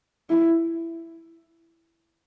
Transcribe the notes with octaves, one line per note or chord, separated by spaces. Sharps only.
E4